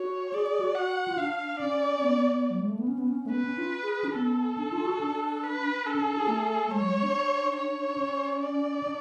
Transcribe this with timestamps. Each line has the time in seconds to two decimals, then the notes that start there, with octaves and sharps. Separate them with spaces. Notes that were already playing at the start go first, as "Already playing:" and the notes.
Already playing: F#4 C#5
0.33 G#4 D5
0.46 G#4
0.60 F#4
0.75 F#4 F#5
1.08 F4
1.18 D4 F5
1.60 C#4 D5
2.03 B3
2.17 B3
2.31 B3
2.50 F#3
2.60 G#3
2.69 A3
2.79 B3
2.88 C#4
2.98 B3
3.09 C#4
3.26 A3
3.30 B3 B4
3.45 C#4
3.58 F4
3.83 G#4
3.95 G#4
4.04 C#4
4.15 B3 A4
4.58 D4
4.72 F4
4.86 F#4
5.01 D4
5.43 B4
5.86 D4 A4
5.96 C#4
6.07 D4
6.17 G#4
6.28 A3
6.70 G#3 C#5
6.81 F#3
6.93 G#3
7.03 D4
7.56 C#5
7.98 C#4
8.40 D5
8.83 D4